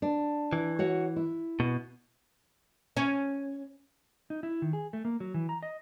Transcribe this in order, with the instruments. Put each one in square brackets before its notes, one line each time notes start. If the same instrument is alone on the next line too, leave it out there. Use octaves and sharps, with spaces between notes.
[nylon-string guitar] D4
[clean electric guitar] E3
[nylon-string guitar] F#4 C#5 F#5
E4
[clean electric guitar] B2
[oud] C#4
[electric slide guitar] D#4
E4
D#3
G#4
A3
A#3
F#3
E3
A#5
D#5